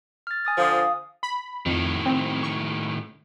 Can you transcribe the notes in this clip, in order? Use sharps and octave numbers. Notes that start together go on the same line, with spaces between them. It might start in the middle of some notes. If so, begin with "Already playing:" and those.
F6 A6
G#5 D#6 A6
D3 F3 F5 D#6
F5 D#6
B5
F2 A2 D#3
C4
C#6